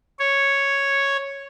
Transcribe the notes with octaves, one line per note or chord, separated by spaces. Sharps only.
C#5